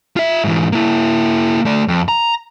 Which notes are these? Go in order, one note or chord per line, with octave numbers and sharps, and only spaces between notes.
F4 E5
G#2 E3
A#3 E4
A3 D5
F2
A#5